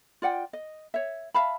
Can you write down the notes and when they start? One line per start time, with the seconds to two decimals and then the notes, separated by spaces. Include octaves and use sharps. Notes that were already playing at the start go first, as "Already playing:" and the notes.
0.22 F4 D5 F#5 G5
0.53 D#5
0.94 C#5 E5
1.34 E5 F5 A5 B5